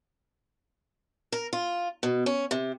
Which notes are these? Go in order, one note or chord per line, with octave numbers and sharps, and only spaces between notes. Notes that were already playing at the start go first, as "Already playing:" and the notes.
A#4
F4
B2
C#4
C3